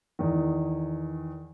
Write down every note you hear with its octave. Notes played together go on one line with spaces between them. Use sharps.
E2 D#3